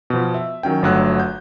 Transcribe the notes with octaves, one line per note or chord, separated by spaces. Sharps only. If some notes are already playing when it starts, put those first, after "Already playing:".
B2 F3
E5
D#3 F#3 C#4 G5
G1 D3 F#3 A3 F#6
G6